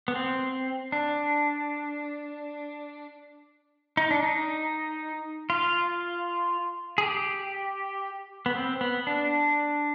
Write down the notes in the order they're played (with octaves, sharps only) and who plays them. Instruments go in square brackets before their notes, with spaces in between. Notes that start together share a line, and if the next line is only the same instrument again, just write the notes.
[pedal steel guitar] B3
C4
D4
D#4
D4
D#4
F4
G#4
G4
B3
C4
B3
D4